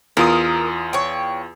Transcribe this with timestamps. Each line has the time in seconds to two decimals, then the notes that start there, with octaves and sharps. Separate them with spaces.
0.17 E2 F4 A#4 D#6
0.93 C#5 G5